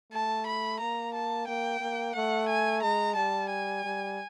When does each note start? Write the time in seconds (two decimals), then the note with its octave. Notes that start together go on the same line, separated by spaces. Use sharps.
0.12 A3 A5
0.47 B5
0.80 A#3 A#5
1.15 A5
1.48 A#3 G5
1.81 A#3
2.16 A3 F#5
2.49 G#5
2.83 G#3 A#5
3.16 G3 A5
3.51 G#5
3.85 G3